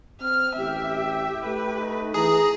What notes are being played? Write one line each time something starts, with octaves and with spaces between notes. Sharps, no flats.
C4 F6
A1 G4 E5 G5
A3 B4
D#4
E3 G#4 A#5